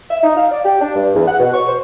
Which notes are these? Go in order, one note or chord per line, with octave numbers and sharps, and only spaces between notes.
E5
D#4
F5
D5
G4
D4
G2
E2
F#5
B2
C#6
C5